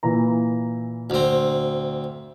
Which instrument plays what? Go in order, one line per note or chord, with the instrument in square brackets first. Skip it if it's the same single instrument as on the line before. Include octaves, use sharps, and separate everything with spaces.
[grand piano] A#2 E3 A#5
[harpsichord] D2 C4